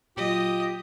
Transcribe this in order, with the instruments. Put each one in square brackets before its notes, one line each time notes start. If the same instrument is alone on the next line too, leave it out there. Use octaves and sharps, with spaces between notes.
[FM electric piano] A#2 F#3 [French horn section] F4 [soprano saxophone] G4 [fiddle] D#5 D#6